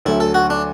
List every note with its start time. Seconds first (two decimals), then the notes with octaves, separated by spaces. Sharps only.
0.05 D2 D3 F#3 A3 E4
0.20 A4
0.34 F#4
0.50 D4